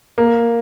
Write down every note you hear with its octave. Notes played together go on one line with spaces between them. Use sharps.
A#3